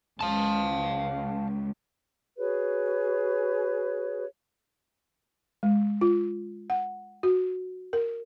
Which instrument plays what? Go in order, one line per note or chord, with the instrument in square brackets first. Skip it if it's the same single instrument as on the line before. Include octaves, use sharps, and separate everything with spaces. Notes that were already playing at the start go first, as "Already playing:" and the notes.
[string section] C#2 [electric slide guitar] F5 A5
[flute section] F#4 G#4 B4 C#5
[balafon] G#3
F4
F#5
F#4
A#4